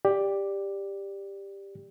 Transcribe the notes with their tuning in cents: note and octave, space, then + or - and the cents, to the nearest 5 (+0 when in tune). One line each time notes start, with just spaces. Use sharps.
G4 +10 D5 +0